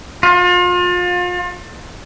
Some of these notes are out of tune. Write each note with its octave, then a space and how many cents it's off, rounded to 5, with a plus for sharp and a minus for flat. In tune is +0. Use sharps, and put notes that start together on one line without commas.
F4 +35